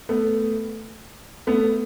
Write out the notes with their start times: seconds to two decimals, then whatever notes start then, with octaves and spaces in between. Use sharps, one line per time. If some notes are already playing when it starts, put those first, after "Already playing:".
0.09 A3 B3
1.47 A3 B3